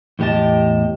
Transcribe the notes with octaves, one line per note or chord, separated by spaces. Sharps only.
E2 A2 G4 D#5 A5